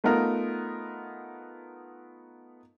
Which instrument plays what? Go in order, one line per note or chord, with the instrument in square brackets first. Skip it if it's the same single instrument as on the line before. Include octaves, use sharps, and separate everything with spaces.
[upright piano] A3 B3 D#4 F4 A#4